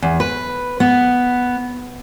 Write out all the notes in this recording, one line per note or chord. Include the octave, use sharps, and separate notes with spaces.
E2
B4
B3